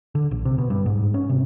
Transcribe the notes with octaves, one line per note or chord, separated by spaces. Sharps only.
D3
A#1
C3
B2
G2
G#2
C#4
C3